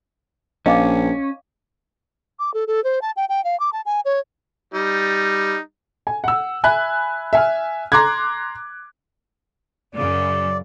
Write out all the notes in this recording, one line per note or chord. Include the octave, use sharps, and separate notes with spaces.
A#1 C#4 D#5 F5 D6
D6
A4
A4
C5
A5
G5
G5
F5
D6
A5
G#5
C#5
G3 D#4
G#5
F#5 E6
E5 G#5 B5 F#6
E5 G#5 F6
A#5 C6 D6 F#6 G#6
F#2 C#3 D5